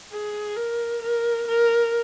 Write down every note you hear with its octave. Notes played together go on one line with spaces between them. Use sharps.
G#4
A#4
A#4
A#4